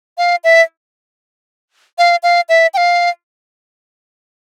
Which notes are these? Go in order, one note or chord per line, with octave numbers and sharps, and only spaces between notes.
F5
E5
F5
F5
E5
G5
F5